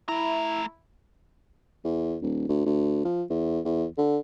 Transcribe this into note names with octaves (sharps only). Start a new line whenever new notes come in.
A3 E4 A#5
E2
D#1
D2
D2
F3
E2
E2
D3